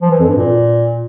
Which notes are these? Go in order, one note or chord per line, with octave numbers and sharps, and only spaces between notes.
F3
E3
F2
G2
A#2